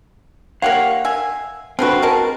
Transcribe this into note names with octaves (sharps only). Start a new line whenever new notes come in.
A#3 G4 C#5 F5 F#5
E5 G#5
D3 C4 F4 F#4 B4
G#3 A#4 A5